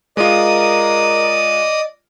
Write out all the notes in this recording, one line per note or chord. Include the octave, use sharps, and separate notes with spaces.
G#3 F4 A#4 D5 D#5 D#6